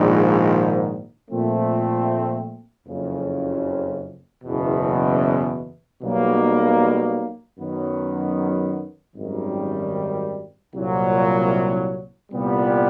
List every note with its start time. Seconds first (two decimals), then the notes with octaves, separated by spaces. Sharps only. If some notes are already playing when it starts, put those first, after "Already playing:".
Already playing: A#1 G#2 D#3
1.30 A#2 F3 A3 C4
2.87 F#1 F2 C#3
4.44 F#1 E2 B2
6.02 B1 B2 G3 A#3
7.58 F#2 D#3 F#3 B3
9.16 G#1 F#2 D#3 G3
10.74 C2 A#2 F#3
12.32 C2 A#2 G3 B3